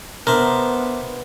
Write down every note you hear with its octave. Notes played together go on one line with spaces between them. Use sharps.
B3 D4 A#4 C5 E5